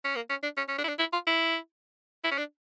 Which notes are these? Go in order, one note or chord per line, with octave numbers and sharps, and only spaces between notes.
C#4
A#3
C#4
D4
C#4
C#4
D4
E4
D4
E4
F4
E4
E4
C#4
D4